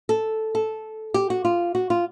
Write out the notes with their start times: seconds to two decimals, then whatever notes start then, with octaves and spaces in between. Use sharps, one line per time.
0.09 A4
0.55 A4
1.14 G4
1.30 F#4
1.45 F4
1.75 F#4
1.90 F4